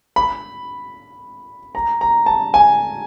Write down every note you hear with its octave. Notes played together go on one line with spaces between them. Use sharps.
B5
A#5
A#5
A5
G#5